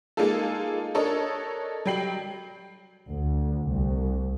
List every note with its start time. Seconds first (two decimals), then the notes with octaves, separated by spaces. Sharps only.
0.17 G#3 A#3 D#4 F4 G#4 A4
0.94 D4 A4 A#4 C#5 D#5
1.85 F#3 G3 G5 C7 F#7
3.11 D2
3.68 C2